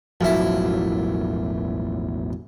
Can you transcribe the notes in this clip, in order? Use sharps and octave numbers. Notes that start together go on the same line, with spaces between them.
E1 A1 F#2 F3 E4